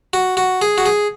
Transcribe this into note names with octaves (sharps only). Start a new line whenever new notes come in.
F#4
F#4
G#4
F#4
G#4